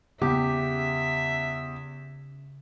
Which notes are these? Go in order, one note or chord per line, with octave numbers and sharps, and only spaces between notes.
E2 C#3 G4 E5